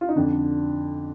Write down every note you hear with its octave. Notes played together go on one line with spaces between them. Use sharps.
F4
D#4
F2 D3 D4